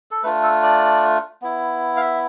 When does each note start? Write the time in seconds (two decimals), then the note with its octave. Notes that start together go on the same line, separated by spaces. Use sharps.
0.11 A4
0.23 A3 D4 F4 B4
0.43 A4
0.63 D5
1.42 B3 E4
1.96 F5
2.01 E5